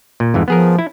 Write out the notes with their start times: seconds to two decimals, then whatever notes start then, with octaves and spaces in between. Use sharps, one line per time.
0.20 A#2
0.34 F2 G#2 E3
0.48 F3 B3 G#4 A#4
0.79 E4